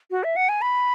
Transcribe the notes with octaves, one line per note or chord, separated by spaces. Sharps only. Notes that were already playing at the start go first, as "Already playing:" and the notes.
F#4
E5
F#5
G#5
B5